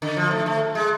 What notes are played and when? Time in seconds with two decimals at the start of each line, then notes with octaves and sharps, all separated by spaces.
0.02 D3
0.17 F3
0.31 A3
0.46 A3
0.75 G#3